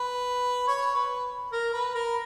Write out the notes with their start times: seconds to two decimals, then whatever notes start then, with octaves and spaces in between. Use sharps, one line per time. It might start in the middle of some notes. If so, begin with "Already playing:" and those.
Already playing: B4
0.68 C#5
0.95 B4
1.52 A#4
1.74 B4
1.95 A#4